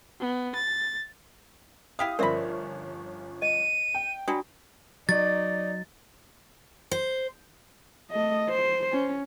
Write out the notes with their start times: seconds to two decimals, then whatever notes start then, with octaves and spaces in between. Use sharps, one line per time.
0.20 B3
0.55 A6
1.99 E4 G4 F5 D#6
2.19 G1 F3 C#4 A#4 C5 D5 E5 B5
3.42 D#5 D#7
3.95 G5
4.28 F#3 G3 D4 F#4 D#6
5.09 F#3 D#4 D5 A6
6.91 C5
8.10 A3 D#5
8.49 C5
8.92 C#4